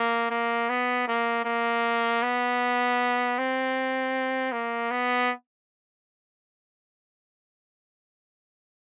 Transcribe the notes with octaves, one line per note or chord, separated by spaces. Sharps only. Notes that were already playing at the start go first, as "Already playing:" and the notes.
Already playing: A#3
A#3
B3
A#3
A#3
B3
C4
A#3
B3